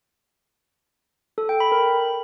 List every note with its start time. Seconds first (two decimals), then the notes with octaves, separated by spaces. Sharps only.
1.38 A4
1.49 G5
1.60 B5
1.72 A#4